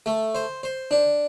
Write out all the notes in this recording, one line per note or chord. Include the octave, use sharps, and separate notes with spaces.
A3
C5
C5
D4